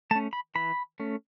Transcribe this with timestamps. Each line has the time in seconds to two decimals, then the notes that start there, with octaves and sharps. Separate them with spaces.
0.11 A3 A5
0.15 C#4
0.33 B5
0.55 E3 B5
1.00 A3 C#4